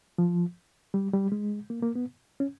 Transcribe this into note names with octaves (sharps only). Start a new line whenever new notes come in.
F3
G3
G3
G#3
A#3
A#3
B3
C#4